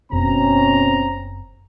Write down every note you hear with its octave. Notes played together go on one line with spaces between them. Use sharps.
F#1 B2 C4 C#4 A#5